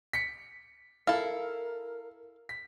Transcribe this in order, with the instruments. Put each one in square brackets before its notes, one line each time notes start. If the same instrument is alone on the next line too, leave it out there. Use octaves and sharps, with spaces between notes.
[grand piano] B6 C#7
[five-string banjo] E4 A4 [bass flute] A#4 [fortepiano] F5
[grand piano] B6